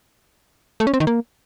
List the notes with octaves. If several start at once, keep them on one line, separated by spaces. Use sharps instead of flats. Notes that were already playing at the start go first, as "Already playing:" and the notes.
A3
C#4
C4
D#3
A#3